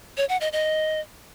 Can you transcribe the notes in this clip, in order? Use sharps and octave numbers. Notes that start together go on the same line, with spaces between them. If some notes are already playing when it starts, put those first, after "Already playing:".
C#5
F#5
D#5
D#5